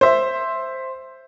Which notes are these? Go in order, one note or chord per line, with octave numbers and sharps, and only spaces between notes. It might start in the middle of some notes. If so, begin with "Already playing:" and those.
C5 E5